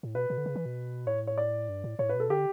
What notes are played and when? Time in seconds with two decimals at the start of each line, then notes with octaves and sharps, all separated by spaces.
0.03 A2
0.15 B2 B4
0.30 B2
0.38 D3
0.46 C#3
0.55 E3
0.66 B2
1.06 A2 C#5
1.27 C#5
1.38 D5
1.69 G2
1.84 A2
1.99 A2 C#5
2.09 B4
2.14 B2
2.20 A4
2.30 D3 G4